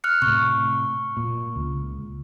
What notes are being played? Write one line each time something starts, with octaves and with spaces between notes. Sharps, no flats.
F6 F#6 C#7
A2 C3 C#6
A#2
C#2